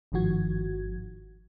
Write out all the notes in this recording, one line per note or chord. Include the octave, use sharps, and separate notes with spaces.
G1 G#2 D#3 F3 F#4 G#6